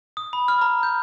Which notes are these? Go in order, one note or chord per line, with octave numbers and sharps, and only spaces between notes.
D#6
B5
F6
A#5
G6